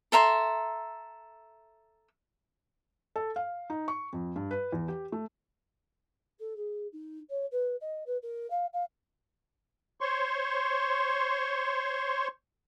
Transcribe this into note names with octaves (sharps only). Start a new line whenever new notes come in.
A4 E5 A#5 C6
A4
F5
D#4
C#6
F2
G2
B4
E2
G4
A3
A4
G#4
D#4
C#5
B4
D#5
B4
A#4
F5
F5
C5 C#5 C6 C#6